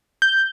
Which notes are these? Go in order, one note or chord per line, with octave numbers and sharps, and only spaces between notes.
G6